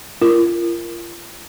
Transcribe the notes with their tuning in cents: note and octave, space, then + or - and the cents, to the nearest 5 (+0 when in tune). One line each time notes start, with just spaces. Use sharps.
F4 -35 A#4 +0